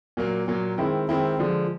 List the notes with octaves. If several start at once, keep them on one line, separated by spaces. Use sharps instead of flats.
A#2 F#3 A#3
A#2 F#3 A#3
D#3 G#3 C4 E4
D#3 G#3 C4 E4
D3 F3 G#3